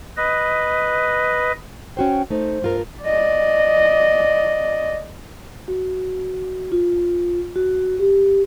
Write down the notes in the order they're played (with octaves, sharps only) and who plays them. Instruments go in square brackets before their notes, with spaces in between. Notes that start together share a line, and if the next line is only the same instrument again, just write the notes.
[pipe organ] B4 D#5
[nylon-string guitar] C#4 F#4 C5 [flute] G5
[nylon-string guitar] A3 D#4 [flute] C5
[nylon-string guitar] G2 F4 A#4
[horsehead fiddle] D5 D#5
[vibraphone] F#4
F4
F#4
G4